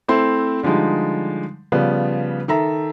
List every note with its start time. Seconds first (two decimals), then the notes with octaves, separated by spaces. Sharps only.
0.08 A3 C4 E4 C5
0.63 D3 F3 G3 G#3 D#4
1.72 C#3 F3 G3 B3
2.48 D#3 A4 E5 A#5